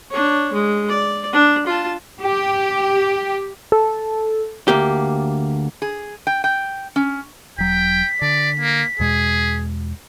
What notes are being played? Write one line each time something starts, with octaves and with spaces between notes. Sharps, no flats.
D4 C#5
G#3
D5
D4
F4 A5
G4
A4
D2 A#3 G4
G#4
G5
G5
C#4
E1 F#3 G5 B6
D3 D5
A#3
E2 B2 G#3 G#4